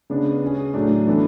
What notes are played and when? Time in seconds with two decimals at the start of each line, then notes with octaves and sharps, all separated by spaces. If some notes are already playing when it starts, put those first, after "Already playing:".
0.10 C#3 G#3 B3 D4
0.42 G#3 C#4 G#4
0.74 A2 F#3 A3 D4
1.07 E3 B3 D4 A4